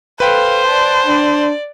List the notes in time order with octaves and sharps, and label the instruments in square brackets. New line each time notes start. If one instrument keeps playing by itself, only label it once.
[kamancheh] A4 F5 [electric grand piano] B4 G5 [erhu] C5
[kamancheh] D5 A5
[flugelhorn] D4 [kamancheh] D5